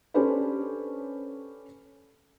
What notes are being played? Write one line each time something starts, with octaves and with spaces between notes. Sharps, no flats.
C#4 D4 G4 A4 B4 C5